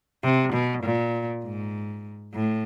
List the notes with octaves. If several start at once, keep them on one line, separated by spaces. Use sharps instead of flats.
C3
B2
A#2
G#2
A2